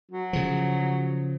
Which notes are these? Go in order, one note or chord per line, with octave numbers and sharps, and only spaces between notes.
F#3
C#3 F3